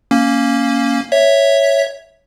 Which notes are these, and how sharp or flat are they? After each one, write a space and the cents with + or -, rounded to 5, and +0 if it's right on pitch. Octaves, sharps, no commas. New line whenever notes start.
A#3 +0 C#4 +0
C#5 +0 E5 +0